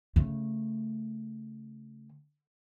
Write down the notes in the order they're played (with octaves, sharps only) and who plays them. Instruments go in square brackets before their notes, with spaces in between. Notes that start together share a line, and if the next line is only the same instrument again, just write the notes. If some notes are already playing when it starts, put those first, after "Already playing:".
[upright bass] C#3 A3